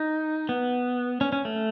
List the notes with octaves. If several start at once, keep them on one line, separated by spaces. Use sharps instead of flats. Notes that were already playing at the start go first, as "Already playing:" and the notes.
Already playing: D#4
B3
C#4
C#4
A3